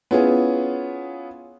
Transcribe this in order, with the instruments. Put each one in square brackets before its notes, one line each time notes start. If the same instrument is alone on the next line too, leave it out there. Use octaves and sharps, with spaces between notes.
[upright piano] B3 C#4 E4 F4 G#4